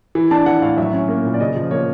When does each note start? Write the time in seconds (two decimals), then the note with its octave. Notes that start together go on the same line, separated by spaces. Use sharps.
0.15 E3
0.31 D4 A5
0.46 E3 F#5
0.62 A2 F5
0.78 F#3 E5
0.93 C#4
1.09 A#3
1.24 A#2
1.34 D5
1.40 C#3 D#5
1.56 F3
1.71 A#3 C#5